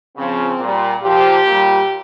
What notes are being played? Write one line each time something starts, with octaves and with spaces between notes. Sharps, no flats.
C#3 F3 C4
A#2 G3
A#2 F3 G4
A#2 G3